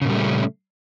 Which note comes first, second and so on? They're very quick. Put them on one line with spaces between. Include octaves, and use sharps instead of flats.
C#3 A#2 G3 A3 C#4